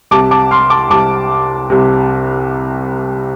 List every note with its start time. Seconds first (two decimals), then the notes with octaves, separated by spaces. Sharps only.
0.11 C2 C3 A5 D6
0.31 A5 D6
0.51 C6 F6
0.70 A5 D6
0.90 C2 C3 A5 D6
1.70 C2 C3